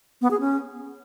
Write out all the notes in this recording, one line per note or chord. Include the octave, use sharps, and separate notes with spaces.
B3
G#4
C#4